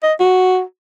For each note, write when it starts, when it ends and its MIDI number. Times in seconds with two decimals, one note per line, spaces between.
0.03 0.13 75
0.20 0.61 66